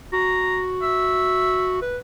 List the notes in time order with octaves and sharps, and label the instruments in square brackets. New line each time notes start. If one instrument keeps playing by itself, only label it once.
[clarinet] F#4 [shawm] A#5
[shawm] E5
[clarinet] B4